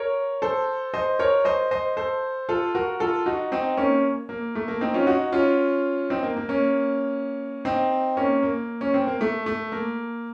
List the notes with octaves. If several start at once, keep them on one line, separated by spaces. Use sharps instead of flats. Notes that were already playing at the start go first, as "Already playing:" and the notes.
Already playing: A#4 C#5
A4 C5
C5 D#5
A#4 C#5
C5 D#5
C5 D#5
A4 C5
F4 A4
F#4 A#4
F4 A4
D#4 F#4
C4 D#4
A#3 C#4
A#3
A3
A#3
C4 D#4
C#4 F4
D#4 F#4
C#4 F4
C4 D#4
A#3
A#3
A#3 C#4
C4 D#4
A#3 C#4
A#3
C#4
C4
A#3
A3
A3
A#3